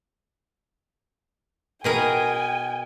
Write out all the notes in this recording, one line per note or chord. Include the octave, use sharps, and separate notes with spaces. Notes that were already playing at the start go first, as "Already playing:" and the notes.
B2 G#4 A#4 G5 G#5